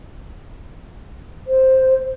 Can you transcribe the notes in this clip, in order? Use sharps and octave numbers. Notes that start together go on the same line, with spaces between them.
C5